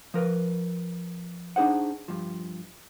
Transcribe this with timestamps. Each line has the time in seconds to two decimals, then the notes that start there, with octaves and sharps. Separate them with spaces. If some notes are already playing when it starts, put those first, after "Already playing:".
0.14 F3 A#4 B4
1.56 D4 D#4 G#4 C5 F#5
2.08 G2 F3